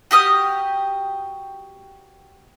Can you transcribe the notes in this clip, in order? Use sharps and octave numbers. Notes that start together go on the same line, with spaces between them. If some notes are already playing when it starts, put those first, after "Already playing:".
F#4 G4 D#6 F6